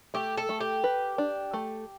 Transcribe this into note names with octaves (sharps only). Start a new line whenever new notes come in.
A3 G4
A4
A3
G4
B4
D4
A3